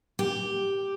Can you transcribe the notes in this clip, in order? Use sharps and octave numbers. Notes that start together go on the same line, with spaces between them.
G4